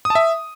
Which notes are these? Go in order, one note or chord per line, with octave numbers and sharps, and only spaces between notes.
D#6
A5
E5